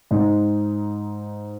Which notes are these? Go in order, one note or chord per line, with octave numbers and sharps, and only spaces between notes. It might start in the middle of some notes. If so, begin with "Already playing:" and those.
G#2 D#4